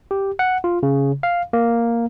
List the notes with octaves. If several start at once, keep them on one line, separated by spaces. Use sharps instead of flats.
G4
F#5
F4
C#3
F5
A#3